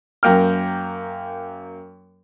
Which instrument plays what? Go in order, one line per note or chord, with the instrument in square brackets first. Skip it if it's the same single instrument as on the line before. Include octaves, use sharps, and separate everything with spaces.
[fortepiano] F#2 A#3 G5 F6